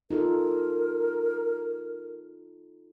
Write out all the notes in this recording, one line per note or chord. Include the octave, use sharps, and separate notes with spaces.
D#4 F4 A4 A#4